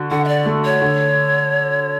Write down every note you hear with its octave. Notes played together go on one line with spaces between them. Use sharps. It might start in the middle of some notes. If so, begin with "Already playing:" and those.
Already playing: D3 F#4
D3 F#5
E5
D5
A3
C#5
D3